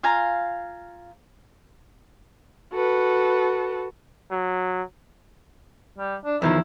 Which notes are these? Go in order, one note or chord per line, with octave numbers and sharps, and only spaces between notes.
F4 F5 G#5 A#5
F#4 A4 B4
F#3
G3
D4
E2 D#3 F3 E4